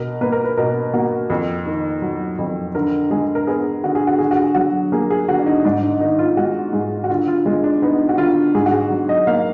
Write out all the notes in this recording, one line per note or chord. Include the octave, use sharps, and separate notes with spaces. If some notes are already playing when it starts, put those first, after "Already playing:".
Already playing: B2 A#4
A#3 B4
A#4
B4
B2 A#4
A#3 F#4
F2
D#3
F#3
F2
D3 A#4
G#3 G#4
A#4
B3 G#4
D3 F#4
G#4
F#4
D3 G#4
F#4
G#4
F#3 F#4
A#3 G#4
G#4
D3 F#4
D4
D#4
G#2 D4
D#4
D#3 D#4
F4
G#3 F#4
G#2 G#4
F#4
D3 F4
F4
G#3 F4
D4
B3 D#4
F#4
D3 F4
G#2 G#4
F#4
G#4
F#3
D#5
A#3 F5